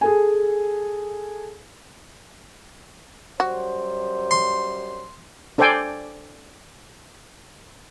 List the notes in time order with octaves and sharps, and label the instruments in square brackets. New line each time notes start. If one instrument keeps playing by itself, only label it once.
[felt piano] G#4 A4 G#5
[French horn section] F#2 G3 C5 [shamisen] F#4
[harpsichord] C6
[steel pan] D4 A4 C5 D5 G5 G#5